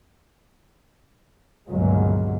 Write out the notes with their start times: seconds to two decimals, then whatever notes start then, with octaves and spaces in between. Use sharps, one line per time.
1.69 G1 C#2 A#2 F#3 G#3